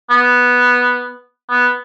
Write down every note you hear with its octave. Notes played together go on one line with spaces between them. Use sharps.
B3
B3